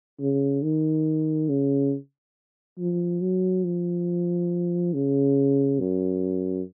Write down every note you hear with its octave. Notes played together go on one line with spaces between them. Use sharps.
C#3
D#3
C#3
F3
F#3
F3
C#3
F#2